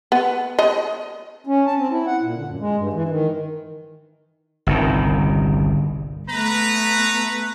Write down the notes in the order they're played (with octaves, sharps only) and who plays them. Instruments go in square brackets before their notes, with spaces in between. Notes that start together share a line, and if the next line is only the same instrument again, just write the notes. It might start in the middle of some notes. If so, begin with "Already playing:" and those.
[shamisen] B3
D#5
[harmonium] C#4
A5
C4
E4
F#5
A#2
D3
F#2
G#3
G2
E3
D#3
[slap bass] G1 C2 D#3
[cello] A3 B3 [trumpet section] B4 A#5